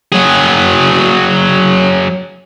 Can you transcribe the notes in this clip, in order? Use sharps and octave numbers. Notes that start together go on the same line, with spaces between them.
F#3 G#4